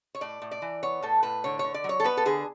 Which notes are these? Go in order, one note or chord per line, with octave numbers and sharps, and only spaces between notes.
C#5
A2 D5
A2
D5
E3
B3 C#5
A2 A4
A2 B4
D3 C#5
D3 C#5
D5
F#3
C#5
A4
B3 B4
A4
D3 G#4